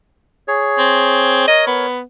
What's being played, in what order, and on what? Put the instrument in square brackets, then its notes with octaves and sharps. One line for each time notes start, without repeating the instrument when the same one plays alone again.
[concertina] G#4 C#5
[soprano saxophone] C4
[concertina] A#4 C#5 [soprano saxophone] D#5
[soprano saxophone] B3